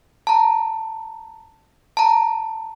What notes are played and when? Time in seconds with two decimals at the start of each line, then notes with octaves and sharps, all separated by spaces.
0.27 A5 A#5
1.97 A5 A#5